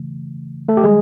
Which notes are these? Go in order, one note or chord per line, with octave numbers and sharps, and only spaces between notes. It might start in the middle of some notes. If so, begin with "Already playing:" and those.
Already playing: C#3 E3 A3
A3 A4
G4
D#3 G3 G#3 G#4